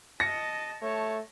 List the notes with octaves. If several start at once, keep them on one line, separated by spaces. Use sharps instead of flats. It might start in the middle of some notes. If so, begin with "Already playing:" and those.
D#5 A5 A#6 C#7
A3 C#5 A5